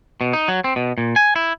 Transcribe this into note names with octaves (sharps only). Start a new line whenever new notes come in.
B2
D#4
F#3
C4
B2
A#2
G#5
E4